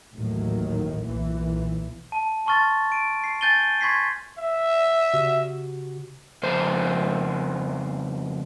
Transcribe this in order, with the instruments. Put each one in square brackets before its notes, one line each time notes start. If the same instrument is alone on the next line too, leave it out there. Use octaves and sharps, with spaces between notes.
[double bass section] A1 D#2 A2 D#3 F#3
B1 A#2 E3
[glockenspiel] A5
A5 C6 C#6 F6 A6
D7 D#7
C7
G#5 G6 A6 D#7 G7
C6 C#6 G#6 B6 C7
[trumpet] E5
[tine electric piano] C#3 F#4 G4
[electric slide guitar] F2 C#3 C5